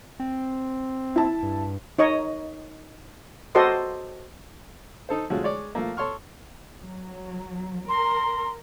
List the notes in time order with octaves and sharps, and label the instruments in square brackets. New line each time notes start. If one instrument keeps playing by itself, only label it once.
[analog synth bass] C4
[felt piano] E4 A5
[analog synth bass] G2
[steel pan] D#4 C#5 D#5
F#4 A4 C5 D5 D#5 C6
[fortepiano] D#4 A4 C5
F3 G#3 A3 C#4 F#4
G#3 C#5 D5
F3 A3 A#3
A4 C#5 C6 C#6 F6
[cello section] F#3
[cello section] A#4 [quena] C6